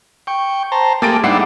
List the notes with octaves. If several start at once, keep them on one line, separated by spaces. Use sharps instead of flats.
G5 C#6
C5 A5 A#5
A3 A#3 G4 G#4 A6 D7
G#2 G3 D4 E4 F#5 C7